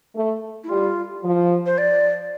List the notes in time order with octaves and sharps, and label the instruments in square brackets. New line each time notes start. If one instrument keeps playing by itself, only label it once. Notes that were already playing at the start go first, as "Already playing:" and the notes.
[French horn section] A3
[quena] E4
[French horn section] G3 [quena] F4
[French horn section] F3
[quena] C5
D5